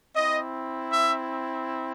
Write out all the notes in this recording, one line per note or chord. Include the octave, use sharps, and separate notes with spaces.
C4 E4 D#5
E5